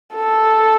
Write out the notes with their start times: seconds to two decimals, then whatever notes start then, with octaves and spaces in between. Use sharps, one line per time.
0.16 A4